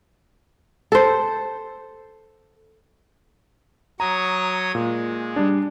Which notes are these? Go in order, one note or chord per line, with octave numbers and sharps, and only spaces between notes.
A4 C5
F#3 C#5 A#5 D#6
A#2 G#3
G3 D4